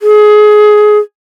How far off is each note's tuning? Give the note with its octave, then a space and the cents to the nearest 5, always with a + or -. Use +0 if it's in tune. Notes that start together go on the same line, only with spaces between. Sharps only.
G#4 +20